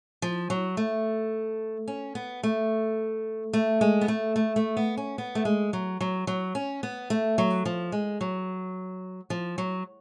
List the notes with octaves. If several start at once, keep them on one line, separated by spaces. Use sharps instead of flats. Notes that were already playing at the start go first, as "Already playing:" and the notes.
F3
F#3
A3
C#4
B3
A3
A3
G#3
B3
A3
A3
A3
B3
C#4
B3
A3
G#3
F#3
F#3
F#3
C#4
B3
A3
F#3
F3
G#3
F#3
F3
F#3